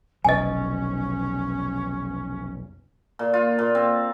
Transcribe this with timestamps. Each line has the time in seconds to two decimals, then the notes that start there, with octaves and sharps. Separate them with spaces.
0.25 F1 B1 C#4 D#5 G#5
3.19 A#2
3.33 F4
3.59 A#2
3.75 C4